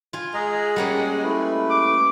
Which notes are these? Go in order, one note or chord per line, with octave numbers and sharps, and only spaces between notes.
F4 G#5
G#3 G#4 D#5 A#5
G3 A#3 C#4 F#5
A3 E4 B4
D6